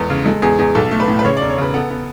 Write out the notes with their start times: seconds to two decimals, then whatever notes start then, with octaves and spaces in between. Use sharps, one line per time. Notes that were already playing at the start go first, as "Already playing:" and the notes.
Already playing: E2 G#3 B3 A4
0.10 C#3
0.26 G#3 A4
0.42 E2 G#4
0.59 E2 G#4
0.75 B1 A4
0.91 A3
1.00 B4
1.08 A2
1.19 B4
1.25 C#3 C#5
1.37 E1 D5
1.50 C#5
1.58 C#3 B4
1.74 B3 A4
1.91 B3